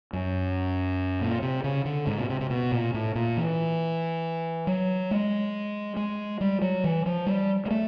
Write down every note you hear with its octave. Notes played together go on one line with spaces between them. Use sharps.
F#2
A#2
C3
C#3
D3
G#2
B2
C3
C3
B2
A#2
A2
A#2
E3
F#3
G#3
G#3
G3
F#3
E3
F3
G3
G#3
A3